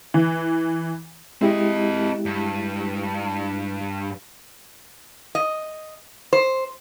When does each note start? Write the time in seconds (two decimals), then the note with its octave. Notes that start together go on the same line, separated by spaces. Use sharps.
0.14 E3
1.42 G#3 C4 E4 G4 D#5
2.26 G2
5.35 D#5
6.33 C5